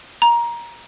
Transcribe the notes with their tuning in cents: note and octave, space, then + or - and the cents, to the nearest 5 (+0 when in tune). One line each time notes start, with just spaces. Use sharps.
A#5 +15